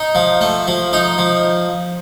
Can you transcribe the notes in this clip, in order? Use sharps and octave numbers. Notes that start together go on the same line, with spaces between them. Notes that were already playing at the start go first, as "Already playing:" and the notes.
Already playing: D#4
F3
A3
F3
D#4
F3